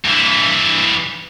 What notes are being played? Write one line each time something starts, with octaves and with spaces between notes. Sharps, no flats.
G2 E3